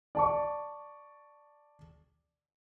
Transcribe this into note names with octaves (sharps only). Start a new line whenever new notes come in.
D5 A5 C#6